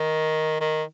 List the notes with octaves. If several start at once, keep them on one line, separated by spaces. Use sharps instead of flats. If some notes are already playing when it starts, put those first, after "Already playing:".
Already playing: D#3
D#3